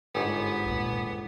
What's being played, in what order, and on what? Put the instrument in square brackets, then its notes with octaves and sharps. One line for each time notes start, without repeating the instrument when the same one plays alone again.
[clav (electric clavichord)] G1 G#2 [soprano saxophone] B3 [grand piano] G4 G#4 C#5
[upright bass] D#2 A#2